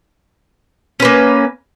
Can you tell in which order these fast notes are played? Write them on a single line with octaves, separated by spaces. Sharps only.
C#4 B4 A#3